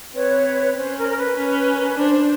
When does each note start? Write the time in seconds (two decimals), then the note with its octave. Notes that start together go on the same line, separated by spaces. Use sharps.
0.14 C4 B4 C#5
0.75 C#4 C5
0.96 A#4
1.10 A#4
1.16 B4
1.36 C#4
1.74 A#4
1.87 B4
1.97 D4 C5